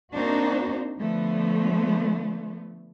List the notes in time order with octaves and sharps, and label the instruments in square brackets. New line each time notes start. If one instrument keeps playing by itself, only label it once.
[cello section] A#3 C4 D4 D#4 F#4 C5
D3 F3 A3 B3